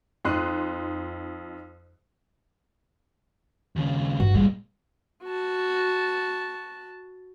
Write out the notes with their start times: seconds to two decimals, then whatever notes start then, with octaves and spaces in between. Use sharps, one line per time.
0.25 F2 D#4 C6 F#6 C7 D#7
3.76 D#2 C#3
4.20 G2 F#4
4.35 A#2 G3 G#3
5.24 F#4 A5